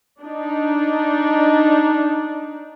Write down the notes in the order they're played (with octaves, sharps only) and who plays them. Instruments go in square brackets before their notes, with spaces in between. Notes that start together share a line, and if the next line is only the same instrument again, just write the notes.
[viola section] D4 D#4